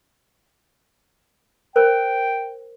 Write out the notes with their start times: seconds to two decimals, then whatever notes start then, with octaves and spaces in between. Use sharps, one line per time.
1.76 A#4 C5 G5